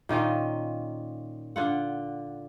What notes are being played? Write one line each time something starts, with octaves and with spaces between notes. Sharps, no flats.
A#2 D#3 C#4 F4
D3 F4 F#5